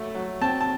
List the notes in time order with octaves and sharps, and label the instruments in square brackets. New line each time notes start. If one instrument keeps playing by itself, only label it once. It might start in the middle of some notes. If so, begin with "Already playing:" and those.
Already playing: [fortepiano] F#3 A3
F#3
C4 A5
A5